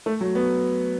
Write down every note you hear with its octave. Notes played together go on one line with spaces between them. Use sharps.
A3
F#3
B3